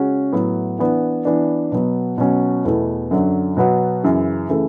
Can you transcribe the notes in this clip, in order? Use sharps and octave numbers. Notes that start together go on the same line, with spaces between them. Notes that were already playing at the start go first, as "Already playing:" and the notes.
Already playing: C#3 G#3 C#4 F#4
A2 F#3 B3 E4
E3 B3 D4
E3 B3 D4
B2 F#3 B3
B2 F#3 C#4 F#4
E2 B2 A3 E4
F#2 D3 F#3
B2 F#3 B3 F#4
F#2 C#3 E3
C#3 E3 A3